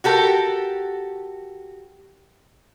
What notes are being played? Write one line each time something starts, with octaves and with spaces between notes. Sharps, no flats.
F#4 G4 A4 A#4